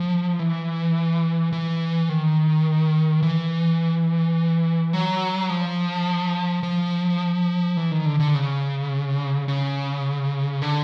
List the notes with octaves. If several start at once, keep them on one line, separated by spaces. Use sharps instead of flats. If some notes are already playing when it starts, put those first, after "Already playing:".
Already playing: F3
E3
E3
D#3
E3
F#3
F3
F3
E3
D#3
D3
D3
C#3
C#3
D3